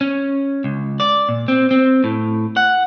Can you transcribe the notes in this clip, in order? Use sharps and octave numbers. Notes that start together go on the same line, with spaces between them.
C#4
C#2
D5
A#2
C4
C4
A2
F#5